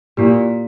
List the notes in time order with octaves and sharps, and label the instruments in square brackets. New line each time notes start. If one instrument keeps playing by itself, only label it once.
[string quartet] A#2 [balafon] A#3 E4 G4